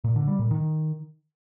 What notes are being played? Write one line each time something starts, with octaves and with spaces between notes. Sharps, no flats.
A#2
D3
G3
A#2
D#3